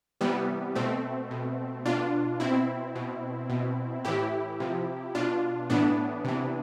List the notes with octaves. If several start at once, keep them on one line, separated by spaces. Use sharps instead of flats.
C3 E3 G3 B3
B2 A3 C4
B2
B2 D4 F4
B2 C4 E4
B2
B2
A2 E3 E4 G4
C3 F3
B2 D4 F4
A2 E3 B3 D4
C3 E3